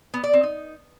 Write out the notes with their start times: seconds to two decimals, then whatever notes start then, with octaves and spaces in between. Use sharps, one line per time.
0.14 B3
0.24 D5
0.33 C4
0.43 D#4